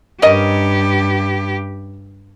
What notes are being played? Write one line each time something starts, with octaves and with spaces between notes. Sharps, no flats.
G2 C#4 G4 A#4 D#5